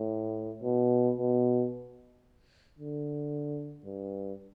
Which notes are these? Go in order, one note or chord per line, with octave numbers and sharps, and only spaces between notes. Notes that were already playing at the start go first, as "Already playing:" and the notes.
Already playing: A2
B2
B2
D3
G2